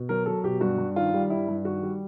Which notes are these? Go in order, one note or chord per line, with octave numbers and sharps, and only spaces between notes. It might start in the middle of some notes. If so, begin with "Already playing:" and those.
Already playing: B2
F#3 A#4
F#3 A4
B2 G4
G2 F#4
G2
D#3 F4
G3
G2 E4
G2
D#3 F#4
G3